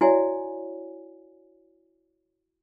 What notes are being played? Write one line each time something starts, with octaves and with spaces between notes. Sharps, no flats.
E4 F#4 C#5 D5 E5 G#5